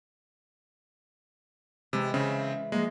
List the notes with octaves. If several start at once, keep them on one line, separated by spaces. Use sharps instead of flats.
C3 E3 G#3
C#3 C4 E5
F3 G#3 A#3